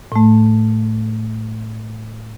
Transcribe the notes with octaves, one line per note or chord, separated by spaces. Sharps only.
A2 A3